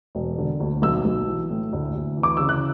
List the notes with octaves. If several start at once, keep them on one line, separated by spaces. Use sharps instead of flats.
E1
D3
D2
B1 E6
B1
E3
A2
D2
D2
E3
D6
C#3 E6
F#6